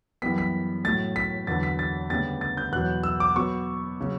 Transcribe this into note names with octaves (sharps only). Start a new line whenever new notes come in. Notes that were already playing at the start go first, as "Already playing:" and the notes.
F#2 E3 G3 B3 B6
B6
A2 F#3 A3 A6
B6
E2 D3 F#3 A6
B6
A6
D2 C#3 G3 B3 A6
A6
G6
E2 B2 F#3 F#6
E6
D6
B2 F#3 B3 C#6
C#3 F#3